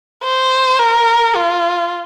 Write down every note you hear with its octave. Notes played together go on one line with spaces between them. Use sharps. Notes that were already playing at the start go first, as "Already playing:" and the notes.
C5
A#4
F4